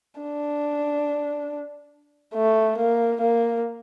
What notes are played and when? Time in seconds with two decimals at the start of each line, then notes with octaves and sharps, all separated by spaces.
0.21 D4
2.35 A3
2.78 A#3
3.21 A#3